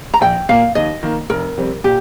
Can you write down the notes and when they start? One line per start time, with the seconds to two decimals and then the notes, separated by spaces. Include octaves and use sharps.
0.14 A#5
0.21 A#1 G5
0.49 A#2 A#3 F5
0.75 D#2 D#5
1.03 D#3 A#3
1.30 F1 A#4
1.57 F2 C3 G3 C4
1.84 A#2 G4